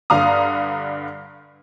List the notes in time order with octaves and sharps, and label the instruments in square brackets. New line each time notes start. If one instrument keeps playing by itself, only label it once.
[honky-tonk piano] G2 D3 F5 A#5 D#6